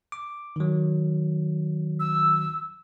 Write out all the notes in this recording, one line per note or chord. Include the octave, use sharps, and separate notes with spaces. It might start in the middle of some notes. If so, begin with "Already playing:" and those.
D6
D#3 F#3
E6